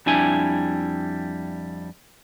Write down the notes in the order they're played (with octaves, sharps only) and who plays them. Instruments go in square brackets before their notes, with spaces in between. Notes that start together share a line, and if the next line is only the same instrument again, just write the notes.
[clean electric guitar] F2 G3 D4 E4 G#5